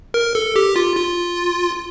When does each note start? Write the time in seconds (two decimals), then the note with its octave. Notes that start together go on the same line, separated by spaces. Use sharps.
0.14 A#4
0.35 A4
0.56 G4
0.76 F4
0.97 F4